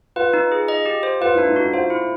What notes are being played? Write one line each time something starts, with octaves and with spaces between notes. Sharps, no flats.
F4 B4
D#4
G#4
D#5
G4
C5
F4 B4
D4 E4
D#4
E4 F#4
F4 C5
E4